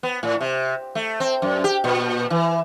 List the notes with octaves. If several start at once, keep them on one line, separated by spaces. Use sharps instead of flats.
B3
A2
C3
A3
C4
F#2
G4
A#2
E3